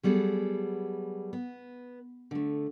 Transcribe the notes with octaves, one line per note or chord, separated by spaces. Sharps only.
F#3 G3 B3 G#4 A4
B3
D3 A3